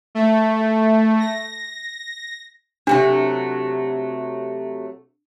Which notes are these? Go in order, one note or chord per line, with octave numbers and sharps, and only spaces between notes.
A3
A#6
C3 F#3 A3 D4